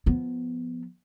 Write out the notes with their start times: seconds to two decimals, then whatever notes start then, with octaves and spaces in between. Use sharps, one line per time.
0.06 F3 B3